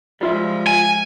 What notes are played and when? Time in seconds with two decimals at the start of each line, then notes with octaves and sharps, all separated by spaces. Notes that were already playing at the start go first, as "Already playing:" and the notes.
0.21 F3 G3 G#3 F4 E5
0.67 G#5